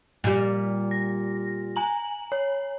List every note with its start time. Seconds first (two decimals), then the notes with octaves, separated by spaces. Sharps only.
0.24 A#2 G3
0.91 A#6
1.76 G#5 A#5 F#7
2.32 C#5